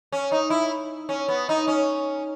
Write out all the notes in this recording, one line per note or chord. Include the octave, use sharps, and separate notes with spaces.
C#4
D#4
E4
C#4
B3
D#4
C#4